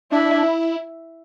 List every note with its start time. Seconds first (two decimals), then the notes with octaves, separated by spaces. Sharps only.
0.12 D4 E4
0.43 E4